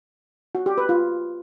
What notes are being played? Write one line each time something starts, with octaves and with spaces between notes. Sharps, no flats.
F#4
G4
B4
F4